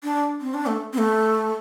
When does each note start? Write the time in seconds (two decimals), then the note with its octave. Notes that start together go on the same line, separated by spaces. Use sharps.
0.03 D4
0.41 C4
0.54 D4
0.66 A3
0.93 C4
0.98 A3